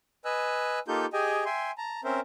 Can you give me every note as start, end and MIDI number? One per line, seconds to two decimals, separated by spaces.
0.25 0.79 71
0.25 0.79 75
0.25 0.79 80
0.25 0.79 88
0.25 0.79 90
0.88 1.06 58
0.88 1.06 63
0.88 1.06 65
0.88 1.06 67
0.88 1.06 69
0.88 1.06 91
1.13 1.44 67
1.13 1.44 68
1.13 1.44 75
1.13 1.44 79
1.13 1.44 80
1.45 1.71 76
1.45 1.71 79
1.45 1.71 80
1.45 1.71 84
1.78 2.01 81
1.78 2.01 82
2.04 2.20 60
2.04 2.20 61
2.04 2.20 70
2.04 2.20 72
2.04 2.20 76